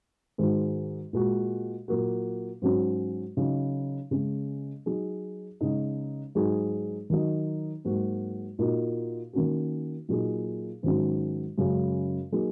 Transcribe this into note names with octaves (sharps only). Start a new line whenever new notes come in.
G#2 D#3 G#3 D#4 F#4
A#2 G#3 F#4
A#2 F#3 A#3 F#4
G#2 F#3 C#4 F#4
C#3 F#3 D#4
C#3 G#3 C#4
F#3 D#4 G#4
C#3 G#3 D#4
G#2 F#3 D#4 G#4
D#3 F#3 D#4
G#2 F#3 A#3 F#4
A#2 A#3 D#4 F#4
D#3 A#3 C#4 F#4
A#2 F#3 D#4 G#4
G#2 D#3 F#3 C#4 F#4
F#2 C#3 G#3
F#3 A#3 D#4 G#4